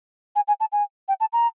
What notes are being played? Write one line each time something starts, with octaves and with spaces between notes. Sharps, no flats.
G#5
G#5
A5
G#5
G5
A5
A#5